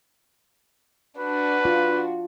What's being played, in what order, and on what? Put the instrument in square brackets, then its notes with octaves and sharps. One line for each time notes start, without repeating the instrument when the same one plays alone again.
[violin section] D4 F#4 [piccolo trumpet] B4
[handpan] F4